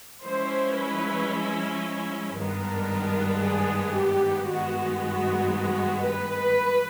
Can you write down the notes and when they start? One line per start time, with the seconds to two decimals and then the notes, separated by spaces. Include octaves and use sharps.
0.23 F3 G#3 C#4 E4 C5
0.76 B4
2.35 G2 D#3 G#3 B3 D4 A#4
3.41 G#4
3.95 G4
4.47 G2 D#3 G#3 B3 F#4
5.01 F#4
5.53 F#4
6.06 B4
6.59 E3